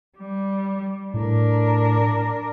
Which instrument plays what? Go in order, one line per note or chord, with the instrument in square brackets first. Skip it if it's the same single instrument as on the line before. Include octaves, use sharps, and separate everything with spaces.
[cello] G3
[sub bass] A2 [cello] D4 A#4